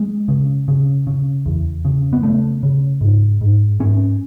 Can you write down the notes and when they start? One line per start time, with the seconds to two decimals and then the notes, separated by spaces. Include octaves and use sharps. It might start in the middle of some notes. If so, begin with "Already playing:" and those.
Already playing: G#3
0.28 C#3
0.68 C#3
1.07 C#3
1.46 E2
1.85 C#3
2.13 B3
2.23 C#3 A3
2.63 C#3
3.01 G#2
3.41 G#2
3.80 G#2 C#4